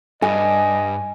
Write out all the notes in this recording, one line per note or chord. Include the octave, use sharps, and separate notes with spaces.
G2 D#5 G#5